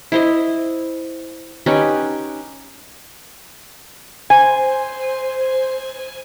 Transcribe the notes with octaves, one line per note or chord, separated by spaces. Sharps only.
E4 C5 D#5
C#4 D#4 G4 B4
C5 G#5